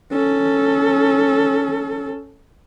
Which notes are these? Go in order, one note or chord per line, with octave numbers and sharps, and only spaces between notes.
C#4 A4